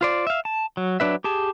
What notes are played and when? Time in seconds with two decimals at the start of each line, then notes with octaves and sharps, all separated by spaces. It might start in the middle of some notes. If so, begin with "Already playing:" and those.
0.01 F4 C5 D5
0.27 E5 F5
0.45 A5
0.77 F#3
1.00 F#3 D4 B4 E5
1.24 G4 G#4 A5